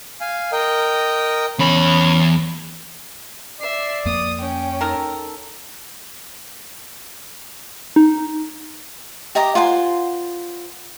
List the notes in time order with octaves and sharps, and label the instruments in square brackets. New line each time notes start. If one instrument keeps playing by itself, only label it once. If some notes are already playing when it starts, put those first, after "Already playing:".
[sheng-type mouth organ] F5 G#5
A#4 D#5 G5
[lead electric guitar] E2 B5 [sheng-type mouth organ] C#4
[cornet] D5 [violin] E5 C7
[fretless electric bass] F2 A#3 [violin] D#6
[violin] C#4 G5
[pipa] D#3 A#4 [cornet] A4
[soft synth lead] D#4
[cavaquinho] G4 D#5 A#5 D6
F4 C5 F#5 G#5